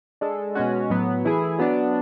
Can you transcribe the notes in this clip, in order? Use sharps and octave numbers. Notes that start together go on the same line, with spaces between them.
G#3 D4 A4
B2 G#3 C#4 F#4
A2 F#3 B3
E3 A3 E4 G#4
F#3 B3 D4